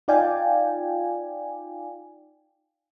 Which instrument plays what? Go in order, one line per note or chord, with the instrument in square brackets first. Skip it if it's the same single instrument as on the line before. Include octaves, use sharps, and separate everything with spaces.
[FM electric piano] D#4 F4 D5 F5 G5 G#5